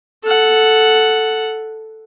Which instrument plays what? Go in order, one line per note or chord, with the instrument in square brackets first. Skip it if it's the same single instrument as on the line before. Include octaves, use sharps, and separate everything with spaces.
[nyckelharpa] A4 F#5